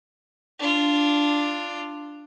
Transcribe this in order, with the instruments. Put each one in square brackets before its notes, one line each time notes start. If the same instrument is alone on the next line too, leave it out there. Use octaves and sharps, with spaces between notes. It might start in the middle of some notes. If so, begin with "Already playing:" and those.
[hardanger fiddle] D4 F4